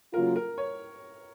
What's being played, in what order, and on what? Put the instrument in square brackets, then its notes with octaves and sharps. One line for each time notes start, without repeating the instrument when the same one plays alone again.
[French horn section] C#3 F#3 A#3 F4 [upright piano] A#4
[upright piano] A#4
C#5